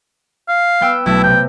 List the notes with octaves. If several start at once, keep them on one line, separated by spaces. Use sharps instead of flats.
F5
B3 G5 E6
B1 A3 E4
C3 G5